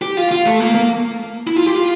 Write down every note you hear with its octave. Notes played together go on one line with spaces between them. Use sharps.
G4
F4
F4
A3
A#3
A#3
E4
F4
G4
F4